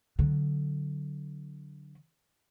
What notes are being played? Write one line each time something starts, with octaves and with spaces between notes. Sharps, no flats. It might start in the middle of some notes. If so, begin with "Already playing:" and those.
D3 F#3